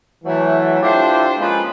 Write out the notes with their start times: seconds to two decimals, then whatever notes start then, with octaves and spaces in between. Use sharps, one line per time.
0.24 E3 F#3 A3
0.80 D4 E4 F4 G4 A4 C5
1.38 F3 G#3 A#3 C#4 G#4 B4